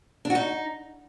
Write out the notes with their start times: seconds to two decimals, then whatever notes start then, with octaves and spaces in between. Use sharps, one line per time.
0.25 D4
0.30 F#4
0.35 D#4